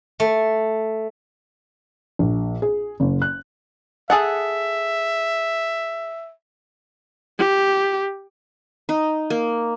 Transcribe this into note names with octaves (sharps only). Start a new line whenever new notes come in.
A3
A#1
G#4
F#1
F#6
G#4 A4 E5 F#5
G4
D#4
A#3